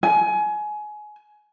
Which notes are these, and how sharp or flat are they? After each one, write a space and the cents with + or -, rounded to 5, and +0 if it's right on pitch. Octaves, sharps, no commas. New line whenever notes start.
G#5 +25